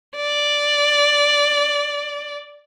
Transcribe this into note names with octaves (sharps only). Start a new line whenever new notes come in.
D5